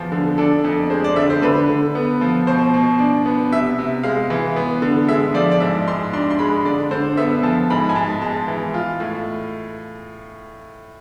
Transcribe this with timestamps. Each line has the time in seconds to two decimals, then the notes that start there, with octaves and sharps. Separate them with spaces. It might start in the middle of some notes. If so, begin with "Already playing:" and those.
Already playing: E2 F3 B3
0.12 D3
0.38 D4 A4
0.64 F2 A4
0.90 G#3 C5
1.04 D5
1.16 D3 E5
1.30 C5
1.42 D3 B4
1.70 D3
1.95 B3
2.21 F3
2.47 B2 C5
2.74 B2
2.99 D4
3.26 B3
3.52 C3 E5
3.79 C3
4.04 G#3 F5
4.30 E3
4.56 B3
4.82 D3
5.09 G#3 E5
5.34 F3 D5
5.51 D5
5.60 G#2 E5
5.88 G#2 C6
6.13 D4 C6
6.30 C6
6.39 G#3 B5
6.65 D3 D5
6.91 D3 C5
7.17 B3 E5
7.43 F3 A5
7.70 G#2 B5
7.89 G#5
7.96 G#2 A5
8.22 G#3 A5
8.48 E3
8.74 F4
9.00 A2